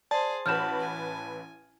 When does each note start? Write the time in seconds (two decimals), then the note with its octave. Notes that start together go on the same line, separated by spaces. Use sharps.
0.11 G#4 C5 D5 A5
0.46 A1 F#4 B4 F6 G6 E7
0.80 G#5